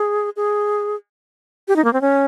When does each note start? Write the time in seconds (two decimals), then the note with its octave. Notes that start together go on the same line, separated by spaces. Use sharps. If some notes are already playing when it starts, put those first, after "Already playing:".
Already playing: G#4
0.36 G#4
1.68 G4
1.76 D#4
1.85 A#3
1.93 C4
2.01 C#4